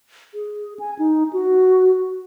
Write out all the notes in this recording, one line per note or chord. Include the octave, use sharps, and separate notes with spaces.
G#4
G#5
D#4
F#4